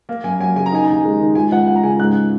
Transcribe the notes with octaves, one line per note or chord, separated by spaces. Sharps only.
A#3
F#2 G#5
F#3 G#5
C#3 G#5
A#5
D#4 G#5
D#2 A#5
G#5
G#3
D#3
C#2 G#5
C#2 F#5
A#3 F#5
A#5
C#3 G#5
G#2 F#6